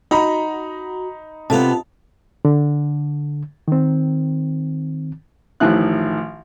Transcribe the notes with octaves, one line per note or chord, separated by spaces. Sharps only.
D#4 F#4 A#5 B5
C3 B3 F4 A4 A5
D3
D#3 C4
A1 D#3 F3 E4 F4 F#6